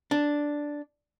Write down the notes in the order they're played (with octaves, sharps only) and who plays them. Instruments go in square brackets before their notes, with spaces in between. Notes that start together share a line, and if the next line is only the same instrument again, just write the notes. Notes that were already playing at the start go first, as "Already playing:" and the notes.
[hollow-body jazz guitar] D4